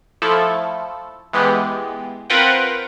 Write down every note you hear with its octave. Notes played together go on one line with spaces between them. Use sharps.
F3 A3 E4 A4
E3 G#3 B3 G4
C4 F4 A#4 B4 F#5 G5